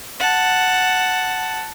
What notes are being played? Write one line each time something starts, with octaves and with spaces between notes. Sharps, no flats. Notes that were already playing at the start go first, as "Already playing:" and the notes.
F#5 A5